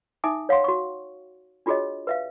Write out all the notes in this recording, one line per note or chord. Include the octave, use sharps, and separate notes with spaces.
D#4 E5 G#5 D6 D#6
C#5 F5 F#5 C6
F#4 C#6
D4 F4 F#4 G#4 C#5 D#5
B4 E5 F5